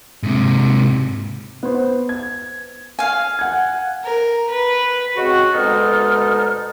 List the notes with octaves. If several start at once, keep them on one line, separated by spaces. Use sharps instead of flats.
G#2 C3
B3 C5
G#6
F5 G#5
F#5 G#6
A#4
B4
C#3 G#3 C4 F#4
D2 B2 G#3 D#4 A4 F6